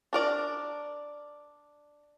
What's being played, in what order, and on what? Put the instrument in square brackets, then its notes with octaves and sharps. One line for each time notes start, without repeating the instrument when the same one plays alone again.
[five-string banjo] D4 A#4 D5